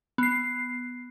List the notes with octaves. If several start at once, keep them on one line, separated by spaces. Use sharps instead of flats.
B3 C7